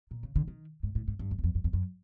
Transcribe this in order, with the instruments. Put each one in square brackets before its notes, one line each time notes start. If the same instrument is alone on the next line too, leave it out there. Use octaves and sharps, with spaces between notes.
[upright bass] A#2
C#3
D3
D#3
G#2
A2
G#2
G2
F#2
E2
F2
F#2
F2
F#2